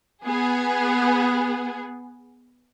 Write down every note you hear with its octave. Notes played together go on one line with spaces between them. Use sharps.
B3 G#4